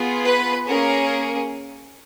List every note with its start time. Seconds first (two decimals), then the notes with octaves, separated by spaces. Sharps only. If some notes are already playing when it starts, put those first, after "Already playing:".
Already playing: B3 F4 G#4
0.25 B4
0.68 A#3 C#4 G#4 A#4